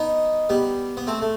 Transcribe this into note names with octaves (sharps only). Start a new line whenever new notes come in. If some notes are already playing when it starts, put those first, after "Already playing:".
Already playing: B3 D#4
G3 B3
B3
A3 C4
A3